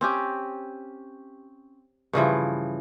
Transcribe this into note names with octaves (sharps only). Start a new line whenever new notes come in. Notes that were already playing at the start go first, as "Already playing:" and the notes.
C4 C#4 G4
G2 C#3 E3 F3